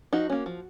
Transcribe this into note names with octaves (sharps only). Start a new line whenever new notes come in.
F3 D#4 F#4
A#3 C#4
F3